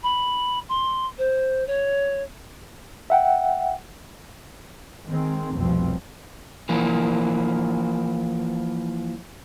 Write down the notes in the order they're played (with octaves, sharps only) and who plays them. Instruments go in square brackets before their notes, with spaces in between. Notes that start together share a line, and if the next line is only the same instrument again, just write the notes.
[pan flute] B5
C6
C5
C#5
[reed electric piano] E5 F#5 G5
[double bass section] D#3 G#3 C4
F1 C2 B2 F3 C4
[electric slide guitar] E3 F3 A#3